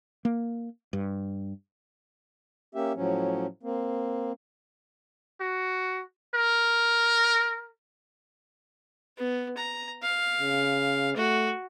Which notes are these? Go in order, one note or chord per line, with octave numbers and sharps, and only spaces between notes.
A#3
G2
A#3 C#4 G4 E5
A2 F3 F#3 C#4
A#3 C4
F#4
A#4
B3
A#5
F5
C#3
A3 F#4